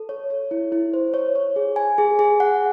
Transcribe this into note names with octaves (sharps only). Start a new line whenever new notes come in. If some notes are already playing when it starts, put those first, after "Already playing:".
Already playing: A4
C#5
C#5
E4
E4
C5
C#5
C#5
G#4
G#5
G#4
G#4
F#5